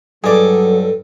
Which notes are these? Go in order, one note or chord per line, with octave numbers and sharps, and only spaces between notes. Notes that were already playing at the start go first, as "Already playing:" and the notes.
G2 F#3 G#4 A4 D5 D6